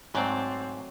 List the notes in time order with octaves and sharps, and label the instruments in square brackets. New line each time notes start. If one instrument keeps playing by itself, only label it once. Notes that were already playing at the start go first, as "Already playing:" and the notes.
[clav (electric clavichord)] G#2 [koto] F#3 A3 D5 [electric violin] C4